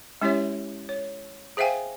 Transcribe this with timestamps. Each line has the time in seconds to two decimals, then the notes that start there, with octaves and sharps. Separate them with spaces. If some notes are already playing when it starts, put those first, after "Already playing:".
0.22 G#3 C#4 E4 G4 C#5 E5
0.89 C#5
1.57 G#4 C5 E5 F5 G5 G#5